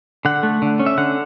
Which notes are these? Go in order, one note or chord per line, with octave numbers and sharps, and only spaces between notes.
D3 F#5
A3
D3
C#4
E5
D3 F#5